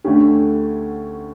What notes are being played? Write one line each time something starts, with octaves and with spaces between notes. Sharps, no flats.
D2 D3 A3 C#4 G4